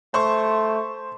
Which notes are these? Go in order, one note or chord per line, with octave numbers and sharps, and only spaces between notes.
A3 C5 C6 C#6